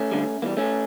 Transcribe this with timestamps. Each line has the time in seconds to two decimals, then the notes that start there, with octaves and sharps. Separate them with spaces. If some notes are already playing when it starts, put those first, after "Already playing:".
Already playing: A3 C#4
0.11 D2 D3 G3
0.42 E2 E3 G3 A#3
0.57 A3 C#4